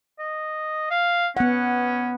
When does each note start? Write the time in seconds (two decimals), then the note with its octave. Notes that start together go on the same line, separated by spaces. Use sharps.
0.19 D#5
0.91 F5
1.37 B3 C#4 F#5